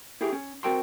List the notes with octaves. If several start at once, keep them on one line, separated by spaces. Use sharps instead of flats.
E4 G4 G#4
C#4
C4 F#4 A#4 G5 A5 C6